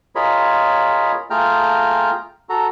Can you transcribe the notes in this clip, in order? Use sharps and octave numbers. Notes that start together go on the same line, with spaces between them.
F4 G#4 A#4 C#5 D#5 B5
A3 F4 G#4 G5 A#5 F6
F#4 A4 A#5